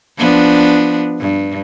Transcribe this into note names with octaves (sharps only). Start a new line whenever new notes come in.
F3 B3 D4
G2